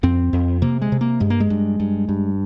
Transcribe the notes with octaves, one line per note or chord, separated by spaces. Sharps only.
F2 C4
F2
C3 A#3
G#3
C3
A#3
G2 G#3
A#3
G#3
G2
G2
G2